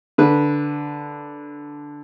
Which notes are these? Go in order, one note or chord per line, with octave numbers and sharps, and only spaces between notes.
D3 B4